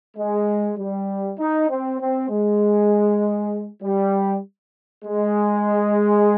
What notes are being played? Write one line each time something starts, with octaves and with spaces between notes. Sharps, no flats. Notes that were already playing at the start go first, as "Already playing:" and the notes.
G#3
G3
D#4
C4
C4
G#3
G3
G#3